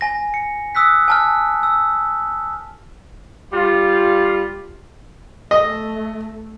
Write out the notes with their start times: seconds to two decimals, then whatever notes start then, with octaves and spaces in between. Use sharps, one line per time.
0.01 G#5 A#6
0.34 C#7
0.75 D#6 E6 F#6 B6
1.08 G#5 A5 F6
1.63 E6
3.53 G3 F4
5.51 A3 D#5